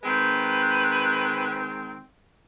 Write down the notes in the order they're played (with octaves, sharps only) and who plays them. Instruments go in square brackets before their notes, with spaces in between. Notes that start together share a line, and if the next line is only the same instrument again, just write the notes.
[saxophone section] D#3 G#3 C4 [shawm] B4